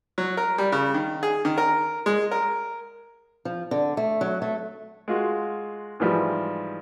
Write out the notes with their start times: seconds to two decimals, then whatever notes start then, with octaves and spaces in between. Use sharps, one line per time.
0.18 F#3
0.37 A#4
0.58 G3
0.72 C#3
0.94 D#3
1.23 G#4
1.45 D#3
1.58 A#4
2.06 G#3
2.31 A#4
3.45 F3
3.71 D3
3.97 A3
4.21 F#3
4.42 A3
5.08 G#3 F4 F#4
6.00 G#2 E3 F3 G3